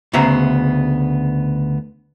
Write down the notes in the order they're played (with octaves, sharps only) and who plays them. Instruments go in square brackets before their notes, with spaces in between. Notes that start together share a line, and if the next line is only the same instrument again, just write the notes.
[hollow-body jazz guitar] D2 C#3 B3 E5 A#5